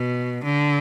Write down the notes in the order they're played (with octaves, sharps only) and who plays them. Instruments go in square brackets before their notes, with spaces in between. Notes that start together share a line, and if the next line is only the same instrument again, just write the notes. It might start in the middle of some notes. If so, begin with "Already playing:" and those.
Already playing: [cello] B2
D3